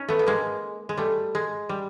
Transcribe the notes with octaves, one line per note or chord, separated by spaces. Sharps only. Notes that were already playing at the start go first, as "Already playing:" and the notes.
Already playing: C#4 D#4
A3 B3
B3
G#3 A#3
G#3
G3 A3
G#3
G3